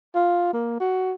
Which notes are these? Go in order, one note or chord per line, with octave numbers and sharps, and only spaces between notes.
F4
A#3
F#4